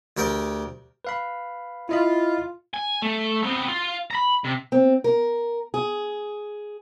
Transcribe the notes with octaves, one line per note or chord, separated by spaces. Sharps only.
D2 G4 A#4 D5 G5
B4 F5 B5
E4 F4 D#5 B5
G#5
A3
B3 C4
F4
A#5 B5
C3
C4
A#4
G#4